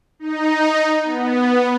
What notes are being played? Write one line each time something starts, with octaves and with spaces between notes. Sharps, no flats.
D#4
B3